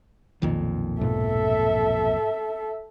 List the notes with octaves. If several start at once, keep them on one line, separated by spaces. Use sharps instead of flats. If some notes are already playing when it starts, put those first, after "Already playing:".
B1 F2 A#2 D#3
G#2 B2 F3 A4 E5